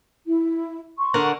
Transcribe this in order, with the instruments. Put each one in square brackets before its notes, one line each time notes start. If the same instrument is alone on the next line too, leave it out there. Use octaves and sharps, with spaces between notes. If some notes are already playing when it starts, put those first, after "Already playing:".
[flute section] E4
C6 C#6
[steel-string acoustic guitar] D3 A#4 F#5